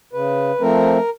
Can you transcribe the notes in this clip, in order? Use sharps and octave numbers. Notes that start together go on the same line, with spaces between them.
C#3 B4
F3 A3 C4 A#4